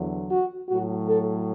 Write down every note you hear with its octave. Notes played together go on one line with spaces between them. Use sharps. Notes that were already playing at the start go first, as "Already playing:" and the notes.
Already playing: E2 D3 F#3
F#4
A2 F#3 F#4
A4